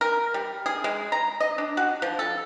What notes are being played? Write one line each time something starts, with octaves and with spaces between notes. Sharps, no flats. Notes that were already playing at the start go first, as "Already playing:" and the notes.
A#4
G3
G#4
G#3
A#5
D#5
D4
F#4
F3
A4